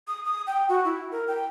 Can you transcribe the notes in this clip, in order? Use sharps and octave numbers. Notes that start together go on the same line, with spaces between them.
D#6
D#6
G5
F#4
E4
A#4
G5